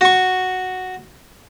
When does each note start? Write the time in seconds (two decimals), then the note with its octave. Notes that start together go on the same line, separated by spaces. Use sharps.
0.01 F#4 C#6